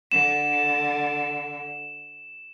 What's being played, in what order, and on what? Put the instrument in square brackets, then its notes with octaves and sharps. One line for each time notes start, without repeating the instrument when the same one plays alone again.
[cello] D3 [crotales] E7